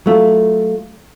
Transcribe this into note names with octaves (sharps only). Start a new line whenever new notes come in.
F#3 A3 F4